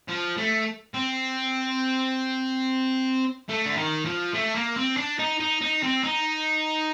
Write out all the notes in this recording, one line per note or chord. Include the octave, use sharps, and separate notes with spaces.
F3
A3
C4
A3
D3
D#3
F3
A3
A#3
C4
D4
D#4
D#4
D#4
C4
D#4